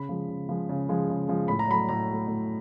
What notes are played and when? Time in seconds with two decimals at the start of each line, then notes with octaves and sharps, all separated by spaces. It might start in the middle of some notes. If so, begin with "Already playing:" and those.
Already playing: C#3 B5
0.09 F3 G#3
0.28 C#3
0.49 F3 G#3
0.69 C#3
0.89 F3 G#3
1.09 C#3
1.28 F3 G#3
1.48 A2 B5
1.59 A#5
1.68 F#3 A3 B5
1.89 A2 A#5
2.09 F#3 A3
2.28 A2